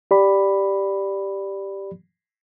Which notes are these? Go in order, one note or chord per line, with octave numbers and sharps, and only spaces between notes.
G4 D5 B5